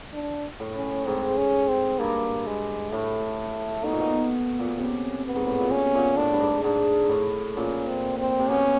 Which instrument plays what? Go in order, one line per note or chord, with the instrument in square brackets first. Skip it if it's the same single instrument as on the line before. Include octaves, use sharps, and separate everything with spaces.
[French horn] D4
[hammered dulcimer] A2
[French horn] C#4
[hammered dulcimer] G#2 [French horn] C4
[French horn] C#4
C4
[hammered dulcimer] G2 [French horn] A#3
[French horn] G#3
[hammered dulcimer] A2 [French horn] A3
[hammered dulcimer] B2 [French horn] D#4
[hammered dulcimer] A#2
B2
A#2
B2
[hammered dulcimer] C3 [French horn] C#4
[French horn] B3
[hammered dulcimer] G#2
A2
A#2
[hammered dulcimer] B2 [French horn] C#4
[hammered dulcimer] A#2
[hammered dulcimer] A2 [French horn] D4
[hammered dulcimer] G2
G#2
[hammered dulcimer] G#2 [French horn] D4
[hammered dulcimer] A2
[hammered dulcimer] A#2 [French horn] C#4
[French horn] C4
C4
[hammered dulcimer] C3
[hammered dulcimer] B2 [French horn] C#4